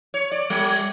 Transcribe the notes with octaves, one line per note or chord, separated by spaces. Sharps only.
C#5
D5
G3